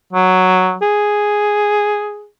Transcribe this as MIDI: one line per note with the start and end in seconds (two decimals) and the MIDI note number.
0.13 0.77 54
0.82 2.27 68